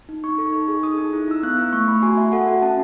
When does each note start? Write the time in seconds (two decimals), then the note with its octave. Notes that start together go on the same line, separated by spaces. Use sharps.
0.09 D#4
0.24 D#4 C#6
0.38 A4
0.53 D#4
0.68 G#4
0.83 D#4 D#6
0.98 D#4
1.13 E4
1.28 E4 E6
1.43 B3 F#6
1.57 E4 E6
1.73 A3 C#6
1.88 A3 B5
2.03 F#4 G#5
2.17 F#4 E5
2.32 A4 F#5
2.47 F#4
2.62 C#4 A5